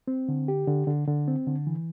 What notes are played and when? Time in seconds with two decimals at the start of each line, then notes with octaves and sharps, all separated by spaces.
0.08 C4
0.29 D3
0.48 G4
0.67 D3
0.87 D3
1.08 D3
1.28 C4
1.47 D3
1.67 E3